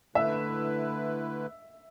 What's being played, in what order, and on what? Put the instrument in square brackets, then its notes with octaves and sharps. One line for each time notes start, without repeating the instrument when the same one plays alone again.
[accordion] D3 A3 E4 B4 [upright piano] E5